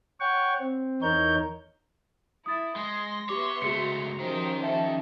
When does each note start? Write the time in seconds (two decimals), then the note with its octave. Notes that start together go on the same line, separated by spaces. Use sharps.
0.20 C#5 F#5 G5 C#6
0.59 C4
1.02 E2 D#4 A#4 C#5 G6
2.46 E4 D#6 A6
2.76 G#3 C6 A#6
3.29 B3 G4 C#5 E5 C6 D6
3.62 C#2 A3 F#4 G#4 A#5 C#7
4.20 D#3 F3 C#4 G4 A#4 C5
4.63 A4 E5